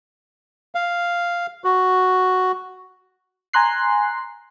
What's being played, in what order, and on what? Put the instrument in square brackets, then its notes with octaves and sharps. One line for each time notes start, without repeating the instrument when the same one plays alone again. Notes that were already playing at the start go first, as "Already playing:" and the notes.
[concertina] F5
F#4
[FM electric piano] G#5 A#5 C6 F#6 C7